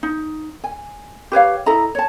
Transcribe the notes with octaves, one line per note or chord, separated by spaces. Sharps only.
D#4
G#5
G4 B4 C#5 F5
E4 A4 D#5 A#5
C#5 A5